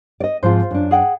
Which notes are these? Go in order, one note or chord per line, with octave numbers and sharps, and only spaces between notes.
D5 D#5
G#2 F3 C4 F4 C5
F#2 D4
G#4 F#5 G5